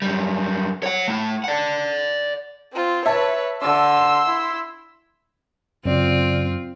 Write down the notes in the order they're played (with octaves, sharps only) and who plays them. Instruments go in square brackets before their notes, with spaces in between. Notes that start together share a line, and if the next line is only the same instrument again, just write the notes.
[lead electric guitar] F#2 G3
C#5 F#5
A3 E4
D5 F#5
[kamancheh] C4 F4
[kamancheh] B4 C#5 [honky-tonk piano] E5 A5
[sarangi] D3 [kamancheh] C6 E6
[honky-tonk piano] E7
[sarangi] E4
[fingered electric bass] F#2 [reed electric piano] C#3 D5 [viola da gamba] C4 F4